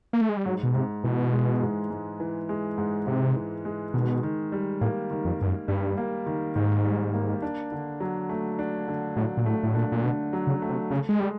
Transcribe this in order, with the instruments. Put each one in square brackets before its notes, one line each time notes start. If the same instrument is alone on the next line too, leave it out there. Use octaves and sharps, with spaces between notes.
[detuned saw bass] A#3
A3
G#3
G3
[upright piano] G#2 [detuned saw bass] F#3
[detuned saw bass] B2
[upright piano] G#2 [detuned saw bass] C3
[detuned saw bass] B2 [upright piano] E3
[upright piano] G#3
G#2
G#2
E3
G#3
G#2
[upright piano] G#2 [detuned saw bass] C3
[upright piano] E3
G#3
[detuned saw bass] B2 [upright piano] D#3
[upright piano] D#3
G3
[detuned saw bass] A2 [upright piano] A#3
[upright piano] D#3
[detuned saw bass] F2
[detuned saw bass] G2 [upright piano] D#3
[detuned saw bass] F#2
[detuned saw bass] G2 [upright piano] G3
[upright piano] A#3
D#3
[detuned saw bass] G#2 [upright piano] D#3
[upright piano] G3
A#3
D4
D3
F#3
A3
D4
D3
[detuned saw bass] A2 [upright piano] F#3
[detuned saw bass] A#2
[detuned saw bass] A2 [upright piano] A3
[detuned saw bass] A2
[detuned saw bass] A#2 [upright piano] D4
[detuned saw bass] A#2
[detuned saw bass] B2 [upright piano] D3
[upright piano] F#3
[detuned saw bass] C#3
[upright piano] A3
[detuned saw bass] C3
[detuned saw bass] C#3 [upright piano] A4
[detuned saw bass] G#3
[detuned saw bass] G3 [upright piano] G#3